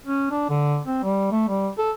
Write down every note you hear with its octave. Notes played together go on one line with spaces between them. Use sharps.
C#4
D4
D3
C4
G3
A3
G3
A4